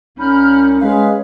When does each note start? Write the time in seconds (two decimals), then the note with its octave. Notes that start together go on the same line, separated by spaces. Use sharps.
0.18 C2 C#4 D#4 B5 F6 G6
0.81 G#3 B4 C#5 F5